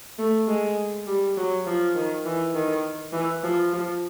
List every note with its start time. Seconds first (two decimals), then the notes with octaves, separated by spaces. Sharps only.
0.18 A3
0.48 G#3
1.07 G3
1.37 F#3
1.66 F3
1.95 D#3
2.25 E3
2.54 D#3
3.13 E3
3.43 F3
3.73 F3